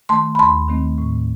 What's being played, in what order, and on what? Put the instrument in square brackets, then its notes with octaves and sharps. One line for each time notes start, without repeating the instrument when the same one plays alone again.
[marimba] D#3 A3 A5 C6
B5
D#2 A5 C6
D#3 A3 C4
A2